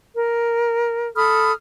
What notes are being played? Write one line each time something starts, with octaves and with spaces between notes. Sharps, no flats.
A#4
A4 B5 D#6 F6